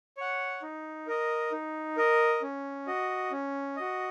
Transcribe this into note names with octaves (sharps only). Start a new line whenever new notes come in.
C#5 F#5
D#4
A#4 D#5
D#4
A#4 D#5
C#4
F#4 D#5
C#4
F#4 D#5